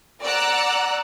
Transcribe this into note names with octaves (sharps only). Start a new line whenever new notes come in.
D5 F#5 A#5 E6 F#6